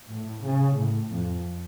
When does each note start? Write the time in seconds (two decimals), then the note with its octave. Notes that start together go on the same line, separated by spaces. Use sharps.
0.10 A2
0.45 C#3
0.78 A2
1.12 F2